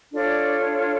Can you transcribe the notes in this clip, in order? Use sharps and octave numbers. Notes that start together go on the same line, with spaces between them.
D4 F4 A4 C#5 D5